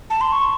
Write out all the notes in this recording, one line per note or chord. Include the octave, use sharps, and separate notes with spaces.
A5
C6
C#6